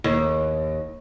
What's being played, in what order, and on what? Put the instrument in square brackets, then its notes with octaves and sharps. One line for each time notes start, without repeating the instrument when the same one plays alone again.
[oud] D#2